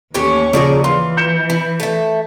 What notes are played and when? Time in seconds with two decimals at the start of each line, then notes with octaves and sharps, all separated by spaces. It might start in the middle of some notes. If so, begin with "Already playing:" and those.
0.14 D#2 A2 E3 C#4 G4 C#6
0.53 C#3 F3 G#4 A#4 D5
0.84 E3 F4 C6
1.17 G6 C#7 E7
1.50 E4
1.80 A3 E5